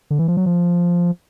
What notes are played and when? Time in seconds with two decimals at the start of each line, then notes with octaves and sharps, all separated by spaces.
0.10 D3
0.19 E3
0.28 F3
0.37 F#3
0.46 F3